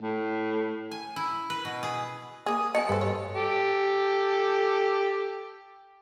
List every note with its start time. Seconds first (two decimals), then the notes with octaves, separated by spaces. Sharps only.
0.02 A2
0.91 G#5
1.16 E4
1.50 B4
1.65 B2
1.83 G#4
2.46 A#3 G#4 D#6
2.75 F#3 B3 D#5 G#5 A5 C#7
2.89 G2 A4 B4 C5
3.01 C#5
3.35 G4 A4